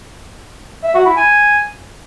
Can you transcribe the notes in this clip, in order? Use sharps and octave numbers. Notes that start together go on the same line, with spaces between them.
E5
F#4
E4
G#5